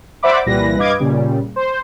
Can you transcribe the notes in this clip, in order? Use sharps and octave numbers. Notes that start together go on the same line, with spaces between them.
C5 D5 E5 F#5 B5 D6
C2 A#2 E3 G3 B4 A#6
G2 B4 D#5 F5 D6 G#6
A#2 C#3 G3
C5